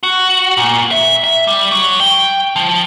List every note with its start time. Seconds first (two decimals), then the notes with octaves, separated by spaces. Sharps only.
0.03 F#4
0.57 A#2
0.91 E5
1.24 E5
1.47 G3
1.72 F#3
2.00 G5
2.56 F3